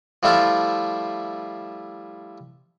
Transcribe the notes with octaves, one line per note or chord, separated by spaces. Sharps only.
F3 G3 A3 E4 F4 A4